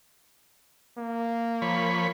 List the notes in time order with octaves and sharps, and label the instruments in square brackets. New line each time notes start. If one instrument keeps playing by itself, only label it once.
[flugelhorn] A#3
[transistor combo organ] F3 C#5 B5